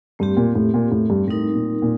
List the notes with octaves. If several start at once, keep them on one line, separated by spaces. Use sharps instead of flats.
G2 A3 C4 G4
A#2
A2
A#2
A2
G2
A2 G3 C4 D#4 A#4
A#2
A#2